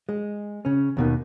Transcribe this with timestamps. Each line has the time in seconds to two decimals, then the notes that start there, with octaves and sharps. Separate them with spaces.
0.09 G#3
0.65 C#3 C#4
0.97 D#2 B2 D#3